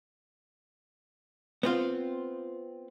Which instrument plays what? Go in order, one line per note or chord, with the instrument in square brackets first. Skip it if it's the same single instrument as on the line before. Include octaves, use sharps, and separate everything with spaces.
[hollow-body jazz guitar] B3 C4 F4